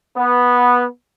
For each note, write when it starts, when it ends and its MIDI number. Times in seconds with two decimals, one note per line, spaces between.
0.16 0.85 59